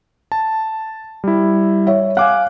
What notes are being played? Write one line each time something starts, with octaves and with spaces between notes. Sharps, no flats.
A5
G3 E4
C#5 E5
F5 G#5 D6 F#6